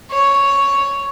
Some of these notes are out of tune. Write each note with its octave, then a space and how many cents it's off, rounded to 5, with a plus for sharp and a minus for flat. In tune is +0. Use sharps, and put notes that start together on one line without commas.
C#5 +5